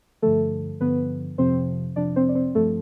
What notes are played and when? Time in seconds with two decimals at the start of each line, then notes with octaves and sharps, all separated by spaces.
0.22 G2 D3 F3 A3 A4
0.80 G2 D3 F3 B3 B4
1.38 F2 C3 F3 C4 C5
1.96 F2 C3 F3 D4 D5
2.16 C4 C5
2.29 D5
2.35 C4 C5
2.55 G2 F3 A3 A4